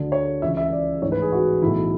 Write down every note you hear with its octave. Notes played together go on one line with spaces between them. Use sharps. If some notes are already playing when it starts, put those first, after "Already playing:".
Already playing: D2 D3
C#5
C#2 C#3 E3 E5
E5
D5
A1 G#2 E3 C#5
B4
G#4
F#4
B1 A2 E3 E4